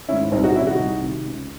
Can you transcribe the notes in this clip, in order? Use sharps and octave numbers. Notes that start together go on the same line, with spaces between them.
G#2 D#3 C#4 E4
C2 C4 D#4
D#4 F#4
C3 D#3 C#4 E4
D#4 F#4
C2
C3 D#3
C#2